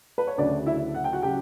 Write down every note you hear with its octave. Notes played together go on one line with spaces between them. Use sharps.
B4
C#5
D2 C#3 F#3 D4 D5
E4 E5
F#5
G5
F#4 F#5
C#3 F#3 G4 G5